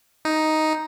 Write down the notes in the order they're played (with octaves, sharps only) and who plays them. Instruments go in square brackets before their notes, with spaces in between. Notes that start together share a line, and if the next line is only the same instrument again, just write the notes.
[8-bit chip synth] D#4